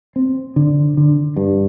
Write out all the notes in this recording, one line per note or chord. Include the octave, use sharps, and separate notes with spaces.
C4
D3
D3
G2